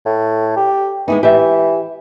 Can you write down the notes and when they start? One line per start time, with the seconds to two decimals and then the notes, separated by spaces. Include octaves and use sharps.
0.06 A2
0.56 G4
1.08 E3 G#3 B3 D#4
1.23 E3 G4 E5